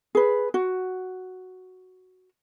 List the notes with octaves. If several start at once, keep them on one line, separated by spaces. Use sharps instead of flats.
G#4 B4
F#4